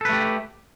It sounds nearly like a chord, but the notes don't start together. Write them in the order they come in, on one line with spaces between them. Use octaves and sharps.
A4 B4 A3 G4